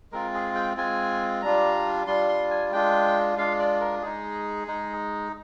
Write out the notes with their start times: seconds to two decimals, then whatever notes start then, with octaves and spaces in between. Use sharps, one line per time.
0.12 G#3 C4 F4 A#4
0.34 G#4
0.55 G5
0.77 G#3 C4 F4 G#5
1.42 G3 D4 F4 A#5
2.07 G3 D4 F4 C6
2.29 C6
2.51 G#5
2.72 G#3 D4 F4 G5
3.37 G#3 D4 F4 F5
3.59 D5
3.81 A#4
4.02 G#3 D#4 G#4
4.67 G#3 D#4